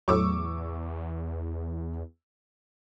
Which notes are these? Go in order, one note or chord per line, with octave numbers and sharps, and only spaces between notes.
E2 A2 F#3 C#6 D6 E6